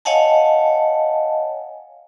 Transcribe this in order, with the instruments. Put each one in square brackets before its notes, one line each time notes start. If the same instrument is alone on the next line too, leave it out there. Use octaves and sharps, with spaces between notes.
[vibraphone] C#5 D#5 F5 F#5 G#5 A5